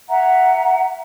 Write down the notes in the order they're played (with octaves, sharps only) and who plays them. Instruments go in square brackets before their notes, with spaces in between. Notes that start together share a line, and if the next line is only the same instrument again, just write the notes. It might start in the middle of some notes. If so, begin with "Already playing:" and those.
[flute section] E5 F#5 A#5